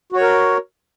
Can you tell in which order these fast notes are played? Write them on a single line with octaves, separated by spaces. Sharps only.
F#4 C#5 A#4